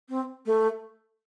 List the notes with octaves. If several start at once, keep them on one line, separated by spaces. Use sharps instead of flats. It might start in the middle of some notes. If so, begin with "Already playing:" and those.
C4
A3